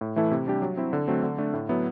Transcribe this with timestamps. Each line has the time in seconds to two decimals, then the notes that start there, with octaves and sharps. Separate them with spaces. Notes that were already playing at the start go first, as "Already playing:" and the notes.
0.01 A2
0.16 E3 A3 E4 A4
0.31 C3
0.47 G3 D4 G4
0.62 F#3
0.77 C4 E4
0.93 D3
1.08 F#3 A3 C4
1.23 D3
1.38 A3 D4
1.53 A2
1.69 F#3 B3 E4